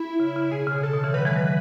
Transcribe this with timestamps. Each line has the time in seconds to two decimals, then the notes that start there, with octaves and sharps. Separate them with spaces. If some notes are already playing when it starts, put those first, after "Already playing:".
Already playing: E4
0.20 C#3
0.36 C#3
0.51 B2 G#4
0.67 C#3
0.76 B2
0.82 C#3 A4
0.93 B2 D#3
1.04 C#3 E3
1.14 D#3 F#3 B4
1.25 E3 G#3
1.35 D#3 F#3